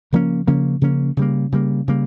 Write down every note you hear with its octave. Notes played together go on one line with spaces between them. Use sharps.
C#3 F3 A#3 C#4
C#3 F3 A#3 C#4
C#3 F3 A#3 C#4
C#3 G3 A#3
C#3 G3 A#3
C#3 G3 A#3